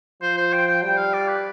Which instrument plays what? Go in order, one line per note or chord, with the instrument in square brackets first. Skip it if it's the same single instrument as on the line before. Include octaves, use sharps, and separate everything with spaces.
[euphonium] F3 [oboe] C5
[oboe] C5
G5
G5
[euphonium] G3 [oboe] G5
[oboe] F5
D5
B4